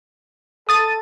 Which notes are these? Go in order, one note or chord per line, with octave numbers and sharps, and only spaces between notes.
A4 D#6 A6 D#7